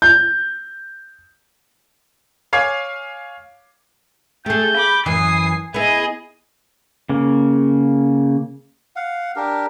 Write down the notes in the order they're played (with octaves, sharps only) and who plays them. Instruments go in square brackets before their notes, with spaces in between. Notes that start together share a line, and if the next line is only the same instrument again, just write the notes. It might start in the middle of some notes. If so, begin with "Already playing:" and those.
[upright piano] G6
[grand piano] C#5 F5 G#5 C#6 D6 G#6
[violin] A3 [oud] G4 G#4 [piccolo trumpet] G6
[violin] B5 D6
[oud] F#2 E3 [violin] G#5 C7 [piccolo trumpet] D#6
[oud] B3 E4 [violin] G#4 D#5 [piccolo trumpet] E5
[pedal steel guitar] C#3 A#3
[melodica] F5 F#5
D4 G4 A#4